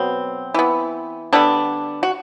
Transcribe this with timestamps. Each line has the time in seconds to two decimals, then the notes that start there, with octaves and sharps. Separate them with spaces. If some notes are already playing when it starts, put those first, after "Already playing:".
Already playing: B2 F#3 B3 C4
0.54 E3 B3
1.33 D3 G3 B3 D4
2.03 F#4